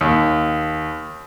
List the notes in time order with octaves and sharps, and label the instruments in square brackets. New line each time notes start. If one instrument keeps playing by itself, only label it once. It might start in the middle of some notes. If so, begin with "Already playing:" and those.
[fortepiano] D#2